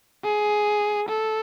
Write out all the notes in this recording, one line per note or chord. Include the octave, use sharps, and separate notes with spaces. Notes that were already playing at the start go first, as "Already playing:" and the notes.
G#4
A4